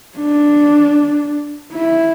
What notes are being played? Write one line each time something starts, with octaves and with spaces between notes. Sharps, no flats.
D4
E4